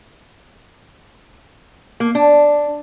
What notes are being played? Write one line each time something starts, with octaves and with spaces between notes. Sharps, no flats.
A#3
D4